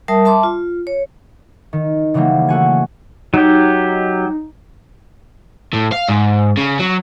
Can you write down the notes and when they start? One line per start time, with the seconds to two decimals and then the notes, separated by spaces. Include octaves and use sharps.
0.08 G3 A#4 E5 A5 D#6
0.25 E5 A5 C6 D6
0.43 F4
0.87 C#5
1.73 D#3
2.14 C#3 E3 F#3 G3 A#3
2.49 A3 F#4 G#5
3.34 F#3 D#4 G4
5.73 A2
5.92 F5
6.09 G#2
6.57 C#3
6.79 F#3